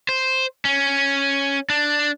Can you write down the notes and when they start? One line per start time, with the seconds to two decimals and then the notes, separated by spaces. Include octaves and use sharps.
0.09 C5
0.65 C#4
1.70 D4